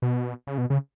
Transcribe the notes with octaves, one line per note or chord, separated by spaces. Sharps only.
B2
C#3
B2
C#3